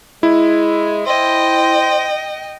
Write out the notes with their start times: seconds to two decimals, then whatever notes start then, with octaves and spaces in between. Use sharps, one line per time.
0.23 G#3 E4
1.06 C5 D#5 G5